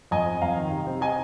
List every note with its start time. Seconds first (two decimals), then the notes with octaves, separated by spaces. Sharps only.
0.11 F2 D#5 G#5
0.26 C4
0.42 F2 F5 A#5
0.57 D#3
0.72 C3
0.87 C4
1.01 C3 D#5 G#5